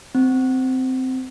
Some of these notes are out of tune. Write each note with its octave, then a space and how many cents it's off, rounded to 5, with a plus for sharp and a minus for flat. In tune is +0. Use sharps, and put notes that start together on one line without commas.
C4 -15